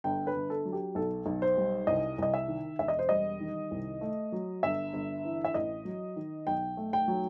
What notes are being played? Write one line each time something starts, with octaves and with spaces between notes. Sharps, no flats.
G1 G5
B4
G1
A4
F#3
G4
B1 A4
B1
C5
G3
C2 D#5
C2 D#5
E5
D#3
E1 E5
D#5
C5
G3 D#5
D#3
C2
A3
F#3
G1 E5
G1
E3
E5
A1 D#5
F#3
D#3
B1 G5
A3
G5
F#3